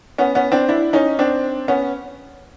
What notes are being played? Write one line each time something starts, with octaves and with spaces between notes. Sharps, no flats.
B3 C#4
B3 C#4
C4 D4
D4 E4
C#4 D#4
C4 D4
B3 C#4